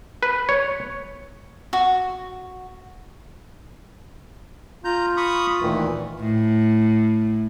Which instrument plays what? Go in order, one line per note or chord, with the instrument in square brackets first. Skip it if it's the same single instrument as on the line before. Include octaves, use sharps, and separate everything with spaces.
[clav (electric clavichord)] B4
C#5
[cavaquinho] F#4
[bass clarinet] F4 [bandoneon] A#5 G6
[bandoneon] B5 C#6 D#6
[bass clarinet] D2 [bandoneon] A#2 D#3 E3
[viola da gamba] A2